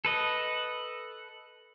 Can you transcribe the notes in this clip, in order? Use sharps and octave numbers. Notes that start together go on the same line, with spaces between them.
A4 B4 D#5